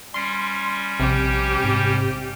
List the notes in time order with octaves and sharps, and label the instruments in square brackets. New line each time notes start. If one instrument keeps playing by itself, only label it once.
[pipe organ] G3 C#4 [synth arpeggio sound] C6
[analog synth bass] A#1 [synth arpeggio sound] C3 [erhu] G4
[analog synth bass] G#2